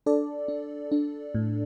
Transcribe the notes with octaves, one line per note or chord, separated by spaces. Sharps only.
D4 A4 D5
D4
D4
A2